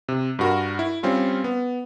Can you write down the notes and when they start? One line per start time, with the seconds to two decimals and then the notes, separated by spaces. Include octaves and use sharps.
0.08 C3
0.39 G2 F#4 A#4
0.79 E4
1.03 G3 C4 C#4 F4
1.44 B3